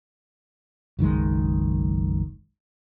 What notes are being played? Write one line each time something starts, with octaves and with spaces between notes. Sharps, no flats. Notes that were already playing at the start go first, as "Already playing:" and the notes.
F#1 B1 D#3 G#3